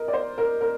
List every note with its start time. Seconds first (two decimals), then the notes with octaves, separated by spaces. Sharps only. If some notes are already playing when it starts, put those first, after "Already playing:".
Already playing: A#4 D#5
0.08 D5
0.13 C5
0.38 A#4
0.61 A#4